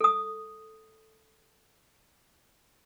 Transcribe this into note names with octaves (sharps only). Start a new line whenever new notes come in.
A4 D#6